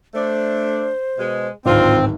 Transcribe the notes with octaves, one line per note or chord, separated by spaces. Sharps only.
A3 D4 C5
B2 G#3
D1 G#1 C4 D4 F4